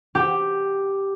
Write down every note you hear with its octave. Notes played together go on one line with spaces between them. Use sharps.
G4